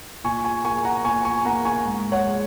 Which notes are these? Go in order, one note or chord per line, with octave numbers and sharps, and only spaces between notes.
A#2 G#5 C#6
G#5 C#6
A#3 G#5 C#6
F#5 A#5
A#2 G#5 C#6
G#5 C#6
A#3 F#5 A#5
G#5 C#6
G#2
C#5 F#5
G#3